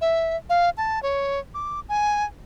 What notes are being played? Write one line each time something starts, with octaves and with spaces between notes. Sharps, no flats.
E5
F5
A5
C#5
D6
G#5